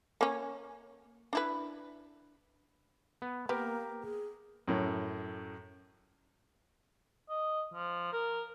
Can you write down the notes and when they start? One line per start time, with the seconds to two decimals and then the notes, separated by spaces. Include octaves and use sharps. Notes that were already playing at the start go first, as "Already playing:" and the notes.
0.21 A#3 C#4
1.33 D4 E4 B4
3.22 B3
3.49 A#3 B3 G4 A#4
4.03 G#4
4.68 F#2 A2
7.30 D#5
7.74 F3
8.13 A#4